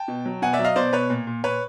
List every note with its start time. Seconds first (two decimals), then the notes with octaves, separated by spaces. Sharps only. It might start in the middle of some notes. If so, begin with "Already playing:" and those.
Already playing: G5 A5
0.08 B2
0.26 F#3
0.42 B2 F#5 G#5
0.53 D5 E5
0.59 F#3
0.64 D#5 F5
0.76 B2 C5 D5
0.93 B2 B4 C#5
1.10 A#2
1.27 A#2
1.43 A#2 B4 C#5